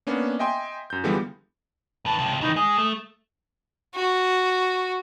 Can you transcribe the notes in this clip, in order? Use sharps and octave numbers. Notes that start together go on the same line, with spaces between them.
A#3 B3 C#4 D4
D#5 E5 G5 G#5 C6
F#2 G6
D3 E3 F3 G3 G#3 B3
D#3 B4 A5
C#2 C3
D#3 E3 D#4
G#3 D#6
A3
F#4